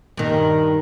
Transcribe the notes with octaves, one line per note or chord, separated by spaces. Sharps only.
G2 D#3